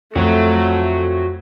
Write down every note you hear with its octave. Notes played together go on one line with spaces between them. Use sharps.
F2 A3 F#4 C#5